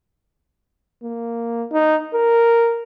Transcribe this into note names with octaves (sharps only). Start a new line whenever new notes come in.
A#3
D#4
A#4